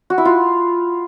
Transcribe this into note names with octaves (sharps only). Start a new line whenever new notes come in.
F#4
E4
F4